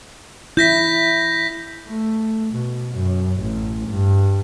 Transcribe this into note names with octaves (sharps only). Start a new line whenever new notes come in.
E4 G6 A#6 B6
A3
B2
F#2
A1
G2